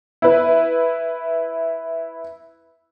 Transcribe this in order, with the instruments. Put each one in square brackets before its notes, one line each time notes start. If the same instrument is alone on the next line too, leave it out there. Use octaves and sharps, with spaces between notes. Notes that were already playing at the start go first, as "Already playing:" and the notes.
[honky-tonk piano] E4 B4